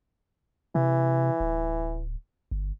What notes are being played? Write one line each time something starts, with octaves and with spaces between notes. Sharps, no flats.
C3 E3
D1
G1